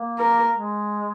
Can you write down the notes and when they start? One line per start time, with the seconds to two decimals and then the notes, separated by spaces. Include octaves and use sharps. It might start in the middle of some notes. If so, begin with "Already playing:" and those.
Already playing: A#3
0.19 A#4
0.54 G#3